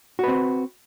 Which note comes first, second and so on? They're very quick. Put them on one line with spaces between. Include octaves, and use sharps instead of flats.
F#4 B4 C4